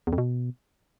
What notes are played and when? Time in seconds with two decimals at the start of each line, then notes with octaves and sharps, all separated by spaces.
0.07 E2
0.13 F2
0.18 B2